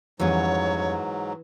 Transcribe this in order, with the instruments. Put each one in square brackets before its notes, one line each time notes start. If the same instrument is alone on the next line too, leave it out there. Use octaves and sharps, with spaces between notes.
[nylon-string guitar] F2 G3 C#4 [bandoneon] G#2 F#3 [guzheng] E3 B3 [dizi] C#5